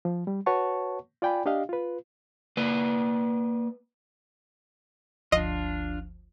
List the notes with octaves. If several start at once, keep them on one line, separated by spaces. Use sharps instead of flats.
F3
G3
F#4 B4 C#5 F#5 A5 C#6
F4 D5 G5 G#5 B5
D4 G4 D#5 F5
F4 B4
A#3 B4 D5
G1 D2 F3 D4 F4 D#5